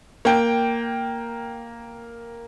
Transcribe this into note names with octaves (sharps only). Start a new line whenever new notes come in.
A#3 G5